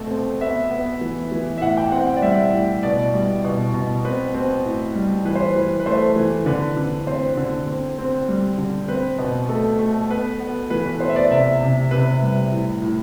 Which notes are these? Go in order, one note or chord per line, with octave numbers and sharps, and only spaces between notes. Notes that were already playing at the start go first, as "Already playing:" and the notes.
Already playing: B2 A3 C4
C4
B3 E5
B3
E3
E3
E5
A2 F#5
G5
C4 F#5
F#5
D5
G3 E5
A2
B2 D5
G3
B2
B2
C4 B4
C4
A2
G3
E3 B4
C5
B4
E3
B4
A3 C5
E3
D3 B4
D3
C4 C5
D3
C4
C4
G3
D3
C4 B4
B2
A3 A4
A3
B3 B4
B3
E3 B4
B4
B3 C5
E5
D5
C3 E5
C3
C3 B4
G3
A2
A2